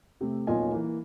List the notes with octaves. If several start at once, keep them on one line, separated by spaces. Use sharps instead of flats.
C3 A3
D#1 B1 F4 C#5 D#5 G#5
E3 A#3